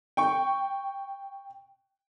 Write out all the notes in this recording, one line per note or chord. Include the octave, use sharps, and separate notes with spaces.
G5 C#6